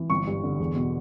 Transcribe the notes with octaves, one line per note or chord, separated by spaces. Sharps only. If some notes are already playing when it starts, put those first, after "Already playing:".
Already playing: E3
G1 C#6
G2
D3
E2
B2